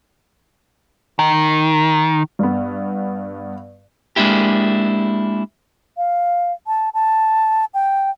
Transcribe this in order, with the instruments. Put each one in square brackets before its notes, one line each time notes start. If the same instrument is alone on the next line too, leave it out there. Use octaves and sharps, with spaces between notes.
[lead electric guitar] D#3
[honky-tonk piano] G2 B3
[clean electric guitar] G#3 A#3 D4 E4 G4
[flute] F5
A5
A5
G5